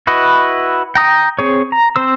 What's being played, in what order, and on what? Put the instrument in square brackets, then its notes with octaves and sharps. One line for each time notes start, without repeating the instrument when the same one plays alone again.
[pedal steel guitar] E4 F#4 B4 D#5
G5 A#5 D#6
C4 G#4 C#5
A#5
C4 C5 E6